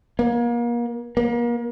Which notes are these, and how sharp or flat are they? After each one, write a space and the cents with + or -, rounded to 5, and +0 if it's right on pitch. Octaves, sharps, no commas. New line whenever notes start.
A#3 +35
A#3 +35